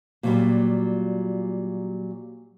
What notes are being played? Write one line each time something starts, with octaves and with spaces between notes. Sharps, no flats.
A#2 F#3 G3